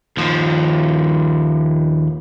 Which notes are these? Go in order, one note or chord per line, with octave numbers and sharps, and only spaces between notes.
D#2 F3